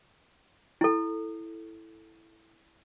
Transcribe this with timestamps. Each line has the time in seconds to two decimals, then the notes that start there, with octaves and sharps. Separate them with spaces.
0.81 E4 A4